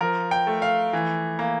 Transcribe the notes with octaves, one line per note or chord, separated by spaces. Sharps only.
F3 A#4
G5
A3
F5
E3
A#3